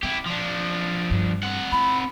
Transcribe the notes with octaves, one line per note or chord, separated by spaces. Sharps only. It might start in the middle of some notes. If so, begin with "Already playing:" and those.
C4 E4 G4
F3 D4
G2
C4 F#5
E4 B5